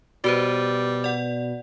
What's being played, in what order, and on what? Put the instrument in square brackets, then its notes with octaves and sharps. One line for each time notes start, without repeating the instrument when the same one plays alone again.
[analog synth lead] B2 [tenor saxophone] G3 [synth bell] F#4 B4 C5
[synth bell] D5 F#5